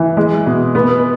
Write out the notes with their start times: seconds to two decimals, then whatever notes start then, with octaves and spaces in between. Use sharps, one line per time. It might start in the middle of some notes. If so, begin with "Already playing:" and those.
Already playing: E3
0.17 G#3
0.46 B2
0.75 B3